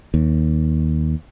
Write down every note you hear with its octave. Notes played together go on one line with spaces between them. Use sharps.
D#2